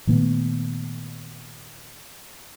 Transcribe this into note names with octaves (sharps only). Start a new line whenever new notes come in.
A#2 D#3 A3 B3